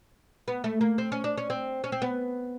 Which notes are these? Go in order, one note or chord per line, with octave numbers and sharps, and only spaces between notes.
B3
A3
A#3
C4
C#4
D4
C#4
C4
C#4
C4
B3